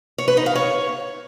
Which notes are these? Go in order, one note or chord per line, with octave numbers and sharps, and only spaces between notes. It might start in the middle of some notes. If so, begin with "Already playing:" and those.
C#5
B4
D#4
F5
C#5